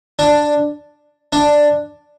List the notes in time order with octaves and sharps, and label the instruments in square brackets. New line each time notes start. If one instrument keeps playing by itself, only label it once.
[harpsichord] D4
D4